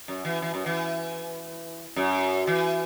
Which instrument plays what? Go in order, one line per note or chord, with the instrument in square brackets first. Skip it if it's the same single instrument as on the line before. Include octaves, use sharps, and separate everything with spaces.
[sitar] F#2
E3
E3
F#2
E3
F#2
E3